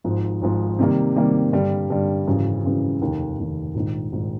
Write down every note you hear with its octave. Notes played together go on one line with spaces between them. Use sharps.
G#1 G#2 F3
G#1 G#2 F3
C3 D#3 G3 A#3
C3 D#3 G3 A#3
G2 D3 G3
G2 D3 G3
G#1 F#2 C#3 E3
G#1 F#2 C#3 E3
F1 D#2 D#3
F1 D#2 D#3
A#1 G#2 D#3
A#1 G#2 D#3